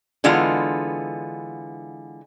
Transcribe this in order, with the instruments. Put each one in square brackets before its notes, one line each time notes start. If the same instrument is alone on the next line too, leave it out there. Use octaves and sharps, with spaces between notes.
[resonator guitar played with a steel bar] D3 E3 G#3 B3 F4